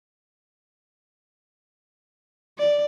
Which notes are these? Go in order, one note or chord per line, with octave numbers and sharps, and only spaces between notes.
D5